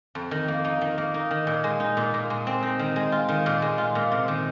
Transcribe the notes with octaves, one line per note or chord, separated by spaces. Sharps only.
F2
D#3
A#3
D#4
D#3
A#3
D#4
D#3
A#2
G#3
D#4
A#2
A#2
G#3
C4
D#4
D#3
G#3
F4
D#3
A#2
G#3
F4
A#2
C3
D#3